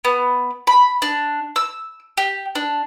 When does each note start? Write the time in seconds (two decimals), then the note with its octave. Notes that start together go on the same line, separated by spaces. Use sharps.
0.05 B3
0.67 B5
1.02 D4
1.56 E6
2.17 G4
2.55 D4